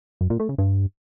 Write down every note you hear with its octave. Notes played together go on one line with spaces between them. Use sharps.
F#2
A#2
A3
C#3
G2